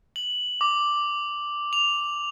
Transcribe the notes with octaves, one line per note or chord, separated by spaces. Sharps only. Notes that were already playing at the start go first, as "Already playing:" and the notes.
F#7
D6
F7